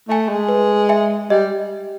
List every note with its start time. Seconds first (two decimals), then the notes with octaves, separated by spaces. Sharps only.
0.09 A3 E5 G#5
0.29 G#3
0.49 B4
0.89 E5 G#5
1.30 G3 D#5